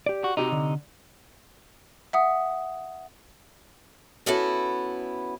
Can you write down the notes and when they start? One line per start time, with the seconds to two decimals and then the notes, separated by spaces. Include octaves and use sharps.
0.06 G4 D5
0.24 F#4
0.37 C3 D#4 F#4 G4 D#5
0.52 D3
2.13 E5 F#5 D#6
4.26 B3 C#4 E4 F#4 A4